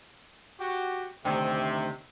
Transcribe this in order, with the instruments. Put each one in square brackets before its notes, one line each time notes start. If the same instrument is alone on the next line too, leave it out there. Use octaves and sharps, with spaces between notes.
[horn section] F#4 G4
[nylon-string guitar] D2 D#3 [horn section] C3